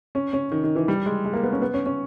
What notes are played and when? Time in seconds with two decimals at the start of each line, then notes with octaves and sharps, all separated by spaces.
0.15 C#4
0.33 C#4
0.52 D#3
0.64 D#3
0.76 E3
0.88 G3
1.06 G#3
1.25 G#3
1.33 A#3
1.43 B3
1.52 C#4
1.62 B3
1.74 C#4
1.86 C#4